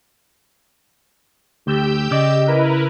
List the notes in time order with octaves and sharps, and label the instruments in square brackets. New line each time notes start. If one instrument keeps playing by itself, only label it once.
[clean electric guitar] D2 [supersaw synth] G4 E6 G6
[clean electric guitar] C#3 D5 [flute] D#5
[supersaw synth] E4 A#4 B4